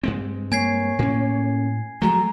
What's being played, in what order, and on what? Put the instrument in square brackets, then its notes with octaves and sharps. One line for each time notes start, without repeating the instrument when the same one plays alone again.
[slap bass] G2 G#3 C4
[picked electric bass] A#3 [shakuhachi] C#5 [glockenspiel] G#5 G#6 C7
[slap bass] A2 [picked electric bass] A#3 C#4
[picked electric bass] F3 F#3 G#3 [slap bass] A3 [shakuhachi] A#5